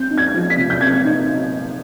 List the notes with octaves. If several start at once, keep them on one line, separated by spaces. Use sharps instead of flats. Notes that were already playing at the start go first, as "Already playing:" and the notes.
Already playing: C4 G6
D#4
G#6
F3
B6
C3
G6
C4 G#6
D#4